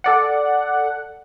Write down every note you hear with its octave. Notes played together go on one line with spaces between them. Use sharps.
A4 D5 F#5